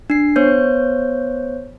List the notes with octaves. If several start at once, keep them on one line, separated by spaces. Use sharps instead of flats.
D4 C7
B3 C5 C#5 G6